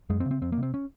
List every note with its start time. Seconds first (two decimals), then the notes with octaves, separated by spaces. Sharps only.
0.10 F#2 G#3
0.20 C4
0.26 C#3
0.31 C4
0.41 F2 C4
0.52 A#3
0.58 C3
0.63 C4
0.74 C#4